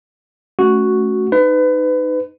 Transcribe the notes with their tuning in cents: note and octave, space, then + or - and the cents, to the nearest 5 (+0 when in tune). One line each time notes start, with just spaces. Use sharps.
A3 -20 C#4 +0 F#4 +0
D#4 -10 B4 +30